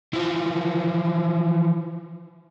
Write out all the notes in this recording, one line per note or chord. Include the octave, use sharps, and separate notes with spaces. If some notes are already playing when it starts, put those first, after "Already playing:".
E3 F3